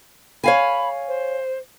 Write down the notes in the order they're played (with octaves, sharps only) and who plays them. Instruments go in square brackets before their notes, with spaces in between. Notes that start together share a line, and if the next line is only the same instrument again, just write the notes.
[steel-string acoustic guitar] C#5 F5 G#5 [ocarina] B5
[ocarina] C5